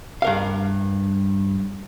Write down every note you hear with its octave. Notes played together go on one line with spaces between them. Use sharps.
G2 A#4 F5